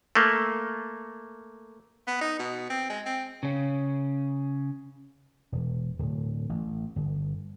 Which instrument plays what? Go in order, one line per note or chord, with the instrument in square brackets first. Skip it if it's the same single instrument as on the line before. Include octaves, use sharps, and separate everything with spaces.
[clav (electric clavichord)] A3 A#3
[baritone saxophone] B3
D#4
B2
C4
G#3
C4
[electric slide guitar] C#3 C#4
[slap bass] E1
D1
A1
G1